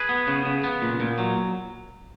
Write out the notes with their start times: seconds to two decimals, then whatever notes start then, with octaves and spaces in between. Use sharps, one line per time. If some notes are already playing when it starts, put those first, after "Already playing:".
Already playing: G#4 B4
0.09 B3
0.27 C#3
0.45 C#3
0.64 B3
0.82 A#2
1.00 A#2
1.18 F#3